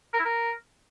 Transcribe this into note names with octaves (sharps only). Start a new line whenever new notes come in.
A#4
E4
A#4